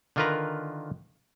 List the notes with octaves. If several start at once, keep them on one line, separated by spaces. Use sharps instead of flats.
D3 D#3 F4 A#4 B4 A#5